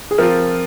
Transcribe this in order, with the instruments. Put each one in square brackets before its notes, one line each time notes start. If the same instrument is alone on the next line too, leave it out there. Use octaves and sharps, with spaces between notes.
[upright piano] G#4
[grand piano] F3 C4 F4 [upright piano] A#4